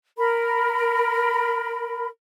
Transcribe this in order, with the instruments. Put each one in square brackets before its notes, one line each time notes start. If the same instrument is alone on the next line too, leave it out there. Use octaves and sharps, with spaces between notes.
[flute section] A#4 B5